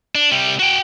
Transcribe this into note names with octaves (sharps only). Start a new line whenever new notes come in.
D4
C3 G3
F#4 G5